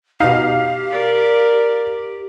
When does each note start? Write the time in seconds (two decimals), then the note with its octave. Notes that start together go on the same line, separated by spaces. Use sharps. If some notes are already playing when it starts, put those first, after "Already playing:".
0.20 B2 D#4 G4 F5
0.90 A#4 D5